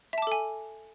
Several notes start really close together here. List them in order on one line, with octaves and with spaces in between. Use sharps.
E5 A5 D6 A4 G#5